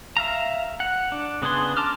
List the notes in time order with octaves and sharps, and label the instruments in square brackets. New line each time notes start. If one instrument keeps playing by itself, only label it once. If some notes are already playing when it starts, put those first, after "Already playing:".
[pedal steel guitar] E5 F5 A#5
F#5
D4
C#3 B3 D4 G#4 C6
A5 A#5 D6 F6